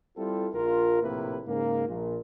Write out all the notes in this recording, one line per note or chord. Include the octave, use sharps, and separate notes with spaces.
G3 C4 E4 F4 G4 A4
A#1 F4 A#4
A#1 A2 C3 A#3 E4 B4
G#2 C#3 A#3
A#1 A#2